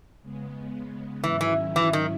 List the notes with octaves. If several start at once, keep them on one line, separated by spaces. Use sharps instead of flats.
C#3 G#3 B3
G#2 D#3 E3 F#3 C#4 E4
E3
E3
D#3